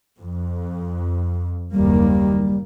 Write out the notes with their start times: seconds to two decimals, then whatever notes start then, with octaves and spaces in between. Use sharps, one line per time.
0.21 F2
1.72 F#1 D#2 G3 A#3